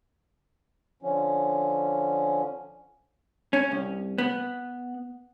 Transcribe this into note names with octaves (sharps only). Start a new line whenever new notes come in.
D3 F3 C#4
C#4
C2
B3